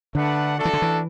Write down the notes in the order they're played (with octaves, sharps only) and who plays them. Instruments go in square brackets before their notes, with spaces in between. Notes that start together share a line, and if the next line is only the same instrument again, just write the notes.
[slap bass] D3 [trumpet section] A3 D4 B4 F#5
[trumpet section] A3 D4 F#4 A4
[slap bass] E3
D3
E3